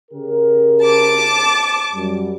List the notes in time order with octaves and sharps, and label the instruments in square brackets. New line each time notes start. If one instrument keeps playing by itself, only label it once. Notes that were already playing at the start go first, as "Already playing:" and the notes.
[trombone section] C#3 G4 A#4
[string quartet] A5 D6
[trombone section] F#2 G3